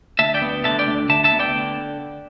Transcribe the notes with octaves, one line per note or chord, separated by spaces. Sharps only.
D2 E5 A5
D5 G5
B3
D3 E5 A5
D5 G5
D2
D2 E5 A5
E5 A5
B3
D5 G5
D3